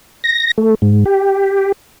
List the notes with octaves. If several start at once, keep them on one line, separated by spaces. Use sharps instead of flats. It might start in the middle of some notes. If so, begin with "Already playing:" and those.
A#6
A3
G#2
G4